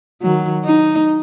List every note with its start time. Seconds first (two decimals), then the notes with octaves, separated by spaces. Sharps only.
0.22 D#3 F#3
0.65 D#4